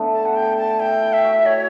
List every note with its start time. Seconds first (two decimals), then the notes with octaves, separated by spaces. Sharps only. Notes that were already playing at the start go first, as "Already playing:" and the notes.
Already playing: D3 A3 B3
0.13 A5
0.26 F#5
0.35 G5
0.57 A5
0.79 E4 G5
1.01 E4
1.13 E5
1.24 F#4
1.46 F#4 C#5